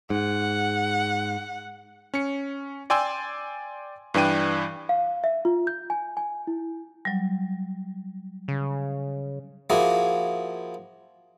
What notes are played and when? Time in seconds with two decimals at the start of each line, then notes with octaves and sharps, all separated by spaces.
0.10 G#2 F#5
2.14 C#4 C#7
2.90 D5 G5 G#5 C6 E6
4.14 G2 E3 D4 G5 D#7
4.89 F5
5.24 E5
5.45 F4
5.67 G6
5.90 G#5
6.17 G#5
6.47 E4
7.05 F#3 G3
8.48 C#3
9.70 F3 A#3 E4 F#4 G#4